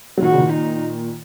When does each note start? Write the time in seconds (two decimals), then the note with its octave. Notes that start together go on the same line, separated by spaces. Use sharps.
0.18 F#3
0.22 A#2 D#3 F#4
0.32 C#3
0.38 A#2 D#3
0.53 D#4